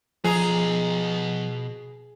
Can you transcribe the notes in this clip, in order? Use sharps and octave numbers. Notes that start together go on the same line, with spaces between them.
B2 F3 G#4 A#5